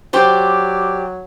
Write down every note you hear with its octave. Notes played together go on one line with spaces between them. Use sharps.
F#3 G4 C5 D5